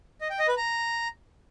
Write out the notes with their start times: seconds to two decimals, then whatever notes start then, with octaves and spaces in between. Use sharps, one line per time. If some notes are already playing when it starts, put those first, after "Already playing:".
0.21 D#5
0.30 G5
0.39 D#5
0.48 B4
0.57 A#5